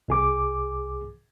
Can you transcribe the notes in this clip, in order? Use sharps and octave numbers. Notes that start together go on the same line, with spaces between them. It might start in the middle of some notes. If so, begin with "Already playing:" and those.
C2 G#4 D6